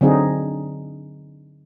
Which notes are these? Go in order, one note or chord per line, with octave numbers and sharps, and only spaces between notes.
D3 F#3 C4 D4 D#4 G#4